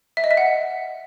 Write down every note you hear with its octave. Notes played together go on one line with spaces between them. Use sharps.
E5
D#5
E5
F#5